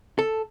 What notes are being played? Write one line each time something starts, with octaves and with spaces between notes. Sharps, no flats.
A4